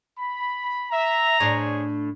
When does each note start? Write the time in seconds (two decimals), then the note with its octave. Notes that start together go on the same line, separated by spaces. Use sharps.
0.18 B5
0.91 E5 A#5
1.40 A2 D4 G#4 C5 C#5